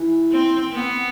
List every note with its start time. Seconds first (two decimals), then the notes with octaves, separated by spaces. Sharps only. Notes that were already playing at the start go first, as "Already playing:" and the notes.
Already playing: E3
0.31 C4
0.72 B3